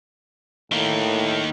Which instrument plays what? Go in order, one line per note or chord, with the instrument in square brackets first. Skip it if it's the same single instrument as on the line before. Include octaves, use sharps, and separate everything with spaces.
[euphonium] A2 [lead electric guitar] D#3 A#3